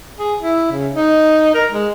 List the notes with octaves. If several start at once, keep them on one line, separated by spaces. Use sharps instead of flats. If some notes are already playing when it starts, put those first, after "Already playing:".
G#4
E4
C#3
D#4
A#4
G#3